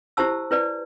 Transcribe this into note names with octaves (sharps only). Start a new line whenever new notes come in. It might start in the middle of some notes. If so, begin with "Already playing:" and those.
E4 G4 C5 A5 E6
E4 B4 D5